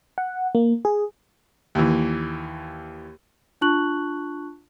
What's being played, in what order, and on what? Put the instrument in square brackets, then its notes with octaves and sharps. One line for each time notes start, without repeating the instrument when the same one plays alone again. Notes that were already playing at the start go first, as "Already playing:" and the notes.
[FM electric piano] F#5
A#3
G#4
[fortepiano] D#2 E3
[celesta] D4 F4 A5 C#6 F#6 F#7